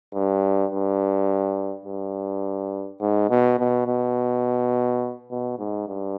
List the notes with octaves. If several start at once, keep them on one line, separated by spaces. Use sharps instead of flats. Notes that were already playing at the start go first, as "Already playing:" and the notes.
G2
G2
G2
G#2
B2
B2
B2
B2
G#2
G2